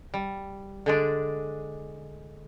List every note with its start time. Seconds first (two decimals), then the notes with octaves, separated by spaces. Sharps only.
0.14 G3
0.86 D3 G#3 D4